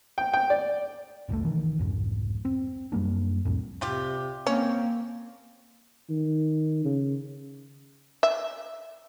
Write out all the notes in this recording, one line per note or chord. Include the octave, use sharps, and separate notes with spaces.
G5
G5
D5
F#1 C#2 A2 A3
B2 D#3 E3
C2 F2 G#2
C4
F#2 G3 A#3 D4
C2 F2 A2
C3 G3 F4 G4
A#3 C4 C#4
D#3
C#3
E5